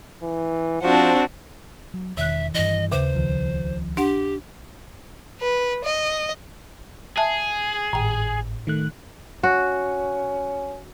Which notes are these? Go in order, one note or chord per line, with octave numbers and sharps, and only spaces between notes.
E3
F3 C4 D4 F#4
F#3
E1 D#3 E5 F#6
G2 E3 D#5
D#2 C#3 C5
C#2 D#3 F3
D4 G4 F#5
B4
D#5
G#4 E5 A5
G#1 A2 G5
D#3 A3 F#6
C#4 F#4